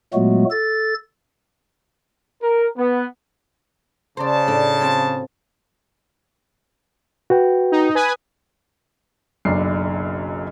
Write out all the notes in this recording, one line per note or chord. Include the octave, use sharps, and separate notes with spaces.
A#2 F#3 G#3 A3 B3 F#4
A4 A6
A#4
B3
C#3 C5 D5 A5
A2 D4 A4
F#3 C4 F4
F#4 B4 G5
D#4
B4 G#5 D#6
F#1 B1 F#2 D4 C7